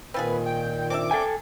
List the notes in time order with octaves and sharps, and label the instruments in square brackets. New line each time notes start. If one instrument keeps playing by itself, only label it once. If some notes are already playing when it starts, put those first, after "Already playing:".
[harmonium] A#2 D#3 [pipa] C4 F4 G#4 [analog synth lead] B4
[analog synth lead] G5
[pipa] C4 D4 E5 [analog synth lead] D6
[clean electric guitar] A4 G5 G#5